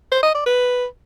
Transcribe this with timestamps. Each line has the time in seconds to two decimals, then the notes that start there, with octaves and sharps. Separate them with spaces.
0.11 C5
0.23 D#5
0.34 D5
0.46 B4